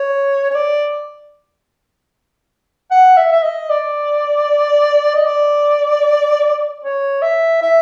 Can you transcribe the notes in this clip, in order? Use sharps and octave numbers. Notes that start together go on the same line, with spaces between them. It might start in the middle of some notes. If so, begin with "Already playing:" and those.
Already playing: C#5
C#5
D5
F#5
E5
E5
D#5
D5
D#5
D5
C#5
E5
E5